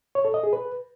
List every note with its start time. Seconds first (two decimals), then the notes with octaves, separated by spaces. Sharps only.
0.15 C#5
0.25 A4
0.34 D#5
0.43 G#4
0.53 B4